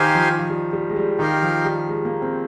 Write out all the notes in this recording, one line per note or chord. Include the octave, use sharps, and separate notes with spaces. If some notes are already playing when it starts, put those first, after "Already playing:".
Already playing: D#3 D#4 G4 C5 F5 G#5
F3
F3
G3
G3
G#3
G3
D#3 D#4 G4 A#4 F5
F3
G3
G#3
A#3
C4